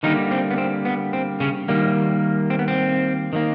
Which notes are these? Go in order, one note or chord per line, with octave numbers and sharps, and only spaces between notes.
D3 D#3 G3 A#3 D#4
C4
B3
C4
B3
C4
C#3 C#4
D#3 G3 A#3
C4
B3
C4
D#3 G3 A#3